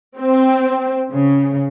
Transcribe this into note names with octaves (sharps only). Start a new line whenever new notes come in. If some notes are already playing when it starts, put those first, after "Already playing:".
C4
C#3